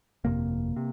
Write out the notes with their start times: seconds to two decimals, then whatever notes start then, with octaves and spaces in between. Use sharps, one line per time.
0.24 G1 F2 C3 A#3
0.76 C3